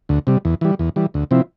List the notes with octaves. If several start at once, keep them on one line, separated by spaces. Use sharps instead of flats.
D2
C3 G3
E2
E3 G3
E2
E3 G3
D2
C3 F3 C4 E4